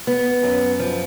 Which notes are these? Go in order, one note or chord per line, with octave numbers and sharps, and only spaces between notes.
B3
F#2
F3